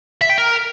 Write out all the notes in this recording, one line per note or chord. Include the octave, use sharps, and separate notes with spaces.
E5
G5
A#4